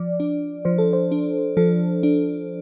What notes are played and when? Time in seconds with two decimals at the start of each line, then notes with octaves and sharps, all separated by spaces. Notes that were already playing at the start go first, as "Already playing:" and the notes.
Already playing: F3 D5
0.20 D4
0.65 F3 C5
0.78 A4
0.93 C5
1.12 D4
1.57 F3 A4
2.03 D4